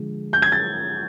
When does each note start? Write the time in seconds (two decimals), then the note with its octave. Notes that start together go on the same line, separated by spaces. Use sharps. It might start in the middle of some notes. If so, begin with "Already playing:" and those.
Already playing: D3 F3 G#3
0.33 G6
0.42 G#6
0.52 A6